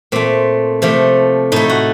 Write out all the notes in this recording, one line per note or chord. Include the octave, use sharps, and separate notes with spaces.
A#2 A3 C4
C3 F3 A3
A2 A3 D#4
F#4